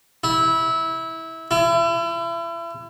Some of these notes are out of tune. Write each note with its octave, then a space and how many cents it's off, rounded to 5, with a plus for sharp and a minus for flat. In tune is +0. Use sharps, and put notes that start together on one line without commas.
E4 -20
E4 +35